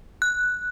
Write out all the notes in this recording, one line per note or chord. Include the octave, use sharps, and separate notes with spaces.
F#6